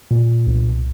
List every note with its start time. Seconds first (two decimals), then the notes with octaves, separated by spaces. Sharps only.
0.11 A#2
0.47 C2